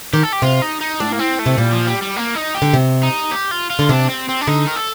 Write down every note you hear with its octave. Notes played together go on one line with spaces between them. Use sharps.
D#3 G4
A4
G4
C3 F4
D#4
D#4
A2 D4
A#3
C4
A3
C3
A#2 G3
F3
G3
G3
A#3
D#4
G4
D3
C3
D#4
G4
F4
F4
D3
C3 D4
C4
C4
D4
D3 D#4
A#4
A4